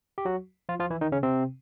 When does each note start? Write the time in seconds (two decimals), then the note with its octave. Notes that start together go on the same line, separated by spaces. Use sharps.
0.18 G4
0.25 F#3 F#4
0.69 F3 F4
0.80 F3 F4
0.90 E3 E4
1.01 D#3 D#4
1.12 C#3 C#4
1.23 C3 C4